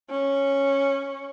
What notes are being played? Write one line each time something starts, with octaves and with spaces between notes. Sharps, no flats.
C#4